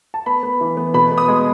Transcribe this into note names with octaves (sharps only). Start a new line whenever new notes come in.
A5
B3 B5
B3
E3
B3
B2 B5
B3
D#6
G#3